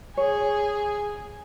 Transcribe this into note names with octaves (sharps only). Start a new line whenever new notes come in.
G#4 C#5